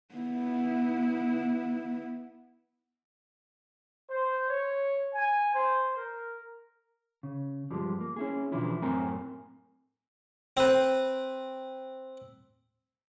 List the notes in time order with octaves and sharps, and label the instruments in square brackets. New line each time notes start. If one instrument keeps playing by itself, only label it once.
[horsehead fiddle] B3 E4
[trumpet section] C5
C#5
G#5
C5
A#4
[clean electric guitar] C#3
G2 F3 G3 G#3
A#3
C#4 E4 G#4
B2 E3 F3 D4 E4 F4
F#2 A2 C4 A#4 G#5 A#5
[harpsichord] C4 B4